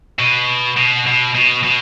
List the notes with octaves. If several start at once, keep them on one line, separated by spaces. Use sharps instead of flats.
B2
B2
B2
B2
B2